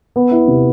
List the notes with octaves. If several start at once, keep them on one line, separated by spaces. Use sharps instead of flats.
B3
E4
C3